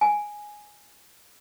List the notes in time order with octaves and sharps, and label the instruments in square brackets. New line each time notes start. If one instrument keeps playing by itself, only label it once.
[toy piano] G#5